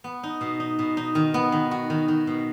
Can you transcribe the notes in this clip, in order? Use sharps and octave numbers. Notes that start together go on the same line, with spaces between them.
B3
D#4
B2
D#4
B2
D#4
D#3
B3
D#3
F#4
D#3
D#3
B2